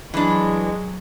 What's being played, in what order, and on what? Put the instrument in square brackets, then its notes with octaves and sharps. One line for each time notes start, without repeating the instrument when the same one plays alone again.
[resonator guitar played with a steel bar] E3 D4 [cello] F#3 [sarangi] G#3